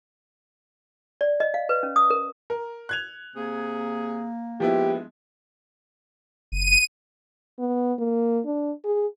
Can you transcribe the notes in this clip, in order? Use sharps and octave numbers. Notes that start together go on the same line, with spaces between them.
D5
D#5
F5
B4
C#4
D#6
A#4
A#4
F#6 G#6 F7
C3 A#3 G#4
G2 F3 G#3 B3 E4 G4
F#1 D#7
B3
A#3
D4
G#4